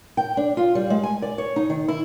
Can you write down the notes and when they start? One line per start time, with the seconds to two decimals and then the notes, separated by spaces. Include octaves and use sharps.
0.17 G5
0.37 D4
0.57 F4
0.75 G3
0.90 G#3
1.03 G#5
1.22 D5
1.38 C#5
1.56 D#4
1.70 D#3
1.88 E4